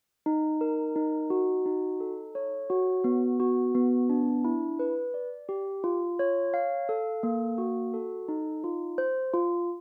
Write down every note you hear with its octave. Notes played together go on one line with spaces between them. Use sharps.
D#4
A#4
D#4
F#4
D#4
A4
C#5
F#4
B3
F#4
B3
D4
E4
B4
D5
G4
F4
C#5
F5
A4
A#3
F#4
A4
D#4
F4
C5
F4